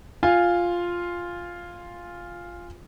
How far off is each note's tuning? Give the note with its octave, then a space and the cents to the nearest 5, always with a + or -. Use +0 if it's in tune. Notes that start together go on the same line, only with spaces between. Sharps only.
F4 +0 F5 +0 G#5 -15